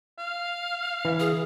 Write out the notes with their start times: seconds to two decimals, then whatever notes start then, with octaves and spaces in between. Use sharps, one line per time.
0.18 F5
1.05 E3
1.20 G#4